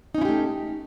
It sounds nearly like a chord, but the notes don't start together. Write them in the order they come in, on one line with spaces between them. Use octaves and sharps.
D#4 C#4 E4 G4 A3